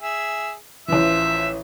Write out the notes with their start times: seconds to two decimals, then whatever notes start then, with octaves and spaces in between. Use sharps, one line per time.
0.01 G#4 E5
0.88 A1 E3 F3 E5